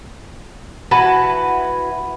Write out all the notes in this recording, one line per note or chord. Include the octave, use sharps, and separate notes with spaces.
E3 F#4 B4 A5